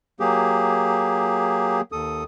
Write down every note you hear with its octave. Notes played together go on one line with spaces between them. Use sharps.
F#3 A#3 G4 G#4
D#2 A4 D#6